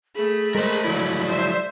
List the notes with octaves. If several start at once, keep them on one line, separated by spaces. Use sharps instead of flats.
A3 G#4 B5
G#3 A#4 C5
F3 F#3 E4 D5
C5 E5